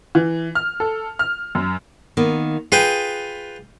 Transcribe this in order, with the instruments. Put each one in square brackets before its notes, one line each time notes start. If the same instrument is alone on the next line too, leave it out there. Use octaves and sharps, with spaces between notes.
[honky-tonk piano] E3
F6
A4
F6
F#2
[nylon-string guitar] D#3 A#3 B3
[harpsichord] F4 B4 G5 [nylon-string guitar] G#4